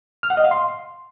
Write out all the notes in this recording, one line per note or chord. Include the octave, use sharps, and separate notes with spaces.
F6
F#5
D#5
F5
C6